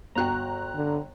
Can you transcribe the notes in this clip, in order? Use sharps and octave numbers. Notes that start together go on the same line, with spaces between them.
G1 F#4 G5 A#5 F#6
D3